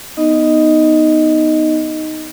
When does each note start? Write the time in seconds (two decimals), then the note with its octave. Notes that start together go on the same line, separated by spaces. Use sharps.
0.17 B3 D#4 D#5